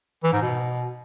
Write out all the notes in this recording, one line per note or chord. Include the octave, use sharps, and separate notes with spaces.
E3
G#2
B2